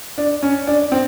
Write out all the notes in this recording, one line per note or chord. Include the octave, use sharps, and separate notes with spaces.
D4
C#4
D4
C4